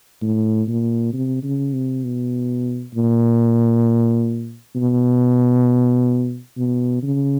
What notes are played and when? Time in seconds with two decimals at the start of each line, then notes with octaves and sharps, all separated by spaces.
0.22 A2
0.68 A#2
1.13 C3
1.43 C#3
1.73 C3
2.04 B2
2.94 A#2
4.76 B2
6.58 B2
7.03 C#3